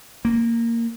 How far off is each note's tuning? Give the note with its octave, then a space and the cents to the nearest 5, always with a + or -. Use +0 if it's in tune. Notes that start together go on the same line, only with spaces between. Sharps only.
A#3 -10